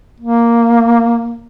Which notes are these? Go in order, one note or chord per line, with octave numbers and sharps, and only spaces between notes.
A#3